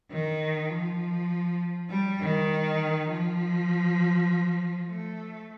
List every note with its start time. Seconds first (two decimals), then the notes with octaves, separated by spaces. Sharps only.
0.10 D#3
0.70 F3
1.89 G3
2.20 D#3
3.10 F3
4.88 A3